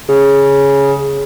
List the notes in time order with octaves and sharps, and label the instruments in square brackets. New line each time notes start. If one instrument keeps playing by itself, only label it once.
[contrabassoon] C#3